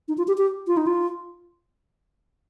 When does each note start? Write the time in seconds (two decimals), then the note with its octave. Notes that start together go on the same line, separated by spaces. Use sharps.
0.08 D#4
0.18 F4
0.28 G4
0.38 G4
0.67 F4
0.77 D#4
0.87 F4